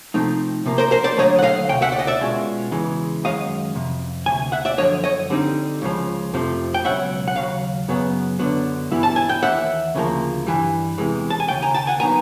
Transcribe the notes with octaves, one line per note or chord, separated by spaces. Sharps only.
C3 F3 A3 C4 D#4
C3 F3 A#3
A#4 C5
A#4 C5
C5 D5
D#2 D3 F#3 A3 C#5 D#5
F#5
D#5 F5
D2 C3 G5
E5 F#5
D5
D#5
D5 E5
B2 G#3 C#4 F4
E2 C#3 E3 G#3
F#2 D#3 G#3 C#4 D#5 F5
F2 C3
D2 C3 G#5
E5 F#5
D5 E5
F#2 D3 F3 C#5 D#5
C#5 D#5
D3 G3 C4 D#4
C#2 C#3 F3
F2 C3 F3 A3
G5
C#2 B2 F#3 C#4 E5 F#5
F#5
D#2 C#3 F#3 F5
F#2 C#3 F#3 B3
F#2 D3 F#3 B3 D4
G2 E3 G3 B3 E4
A5
G#5
G5
D#2 C#3 E3 E5 F#5
D2 C#3 F3 A#3
G2 E3 G3
E2 C3 E3 G#3
A5
G#5
D#2 C#3 G5
G#5 A#5
G5 A5
F#5 G#5
D#3 F#3 B3 D#4 G#5 A#5